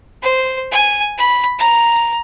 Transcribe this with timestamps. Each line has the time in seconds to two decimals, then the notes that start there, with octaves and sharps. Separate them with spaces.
0.22 C5
0.71 G#5
1.18 B5
1.59 A#5